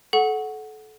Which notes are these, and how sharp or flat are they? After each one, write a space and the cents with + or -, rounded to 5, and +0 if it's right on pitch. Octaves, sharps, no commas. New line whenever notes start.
A4 -30 F#5 +0 C#6 +0